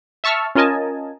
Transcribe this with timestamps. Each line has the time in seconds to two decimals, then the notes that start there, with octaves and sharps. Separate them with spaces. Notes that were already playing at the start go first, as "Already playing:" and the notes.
0.24 E5 A5 C#6 E6 F6
0.55 C#4 F4 A#4 D#5 G#5 A5